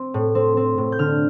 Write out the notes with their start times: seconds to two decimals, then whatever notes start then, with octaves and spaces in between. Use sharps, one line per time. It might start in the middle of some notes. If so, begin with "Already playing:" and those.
Already playing: C4
0.14 A2
0.35 C4
0.57 C4
0.78 A2
0.92 G6
0.99 D3 F6